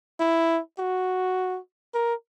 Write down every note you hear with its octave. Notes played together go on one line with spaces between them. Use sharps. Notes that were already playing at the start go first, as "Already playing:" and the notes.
E4
F#4
A#4